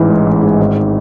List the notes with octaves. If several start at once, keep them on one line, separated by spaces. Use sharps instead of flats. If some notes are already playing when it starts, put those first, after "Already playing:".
Already playing: A1 G#2 E3
G#3
A1
G#2
G#1